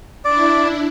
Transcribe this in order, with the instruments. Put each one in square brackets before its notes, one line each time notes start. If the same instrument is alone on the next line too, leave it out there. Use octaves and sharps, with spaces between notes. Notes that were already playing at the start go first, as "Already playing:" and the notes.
[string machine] D4 E4 [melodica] D5